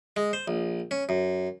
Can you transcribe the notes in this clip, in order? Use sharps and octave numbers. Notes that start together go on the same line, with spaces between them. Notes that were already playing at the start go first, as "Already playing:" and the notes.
G#3
C5
A#1
C#4
F#2